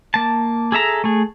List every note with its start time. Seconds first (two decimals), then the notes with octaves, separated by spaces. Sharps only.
0.14 A#3 A5
0.72 G#4 A4 E5 A#5
1.04 A3 G#4